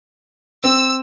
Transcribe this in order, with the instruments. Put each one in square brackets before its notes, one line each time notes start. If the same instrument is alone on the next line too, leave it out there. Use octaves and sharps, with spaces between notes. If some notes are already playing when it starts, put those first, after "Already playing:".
[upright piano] C4 [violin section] E6